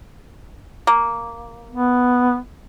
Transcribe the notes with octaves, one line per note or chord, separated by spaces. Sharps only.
A#3
B3